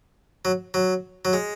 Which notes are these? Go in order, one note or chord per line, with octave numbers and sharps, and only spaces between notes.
F#3
F#3
F#3
G#3